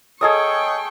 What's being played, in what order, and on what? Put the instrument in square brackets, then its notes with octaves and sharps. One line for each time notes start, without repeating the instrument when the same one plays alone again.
[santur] G#4 A4 D#6 [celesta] C#5 D#5 G#6 [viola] G5 C#6